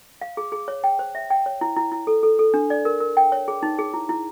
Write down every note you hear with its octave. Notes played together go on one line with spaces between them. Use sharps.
F5
G#4
G#4
C#5
G5
C5
E5
G5
C#5
E4
E4
E4
A4
A4
A4
D4
D5
A#4
A#4
G5
C#5
G#4
D#4
G#4
E4
E4